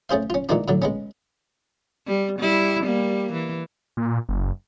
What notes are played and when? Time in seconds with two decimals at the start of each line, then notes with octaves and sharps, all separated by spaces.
0.09 A3 C#4 G#4 C5 F5
0.30 C#4 F4
0.49 A#2 D#3 E3 G#3 A#3 D4
0.68 A2 D3 F#3
0.82 G#3 B3 C#4
2.07 G3
2.39 G3 E4
2.84 G3 A#3
3.33 E3
3.97 A#2
4.29 F#1